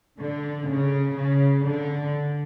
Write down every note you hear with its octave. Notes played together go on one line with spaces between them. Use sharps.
D3
C#3
C#3
D3